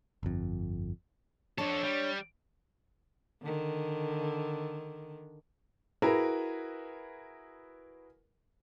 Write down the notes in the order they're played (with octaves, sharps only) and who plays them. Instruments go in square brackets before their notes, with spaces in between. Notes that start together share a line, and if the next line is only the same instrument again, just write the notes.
[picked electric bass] G1 F2
[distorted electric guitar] F3 A4 [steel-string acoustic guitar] D4 C#5
[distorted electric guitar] G3
[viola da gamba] D3 D#3
[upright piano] E4 F#4 G#4 A#4 B4